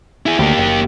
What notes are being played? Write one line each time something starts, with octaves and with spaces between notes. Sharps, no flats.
E4 G#4
D2 A#3 G4
F#1